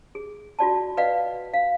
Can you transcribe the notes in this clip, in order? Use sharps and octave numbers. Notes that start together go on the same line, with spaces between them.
G#4
F4 F#4 D5 A5
B4 D5 D#5 F5 F#5
F5